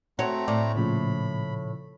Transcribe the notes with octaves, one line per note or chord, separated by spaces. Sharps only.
A3 C4 F#4 C#5 A#5
A2 D5
A#2 C#3 F3 B5